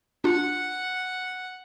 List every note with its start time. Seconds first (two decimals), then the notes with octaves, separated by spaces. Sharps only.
0.24 D4 F4 F#5